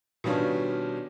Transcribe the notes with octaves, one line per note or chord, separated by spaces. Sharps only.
B2 D#3 G3 C#4 D4 F4